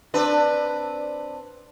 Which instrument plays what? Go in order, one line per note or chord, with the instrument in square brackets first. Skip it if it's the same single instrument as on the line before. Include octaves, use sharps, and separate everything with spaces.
[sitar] C4 D4 B4